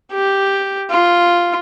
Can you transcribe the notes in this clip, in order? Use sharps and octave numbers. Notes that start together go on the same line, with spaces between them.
G4
F4